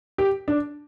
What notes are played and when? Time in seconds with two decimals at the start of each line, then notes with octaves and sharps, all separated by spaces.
0.18 G4
0.48 D4